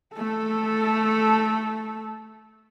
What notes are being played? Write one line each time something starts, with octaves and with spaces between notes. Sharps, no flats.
A3 A4